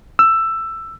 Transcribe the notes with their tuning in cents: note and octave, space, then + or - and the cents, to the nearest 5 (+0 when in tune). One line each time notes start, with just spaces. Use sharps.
E6 +10